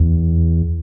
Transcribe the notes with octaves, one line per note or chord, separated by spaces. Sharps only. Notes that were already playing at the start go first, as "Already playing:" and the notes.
Already playing: E2